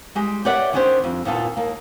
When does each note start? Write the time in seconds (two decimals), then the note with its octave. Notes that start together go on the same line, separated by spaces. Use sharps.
0.15 G3 G#3 G4
0.45 G4 B4 C#5 D5 E5 F#5
0.73 D#3 B3 C#4 D4 G4 C5
1.04 F2
1.25 D#2 A#2 B3 F4 A4
1.57 D#2 A#3